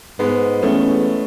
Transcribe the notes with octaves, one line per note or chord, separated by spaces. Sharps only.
G#2 G#3 B3
E2 A3 C#4